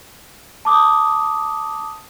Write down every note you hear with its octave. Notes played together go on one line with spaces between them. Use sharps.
A5 D6 D#6